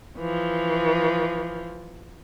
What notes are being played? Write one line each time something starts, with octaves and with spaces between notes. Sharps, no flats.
E3 F3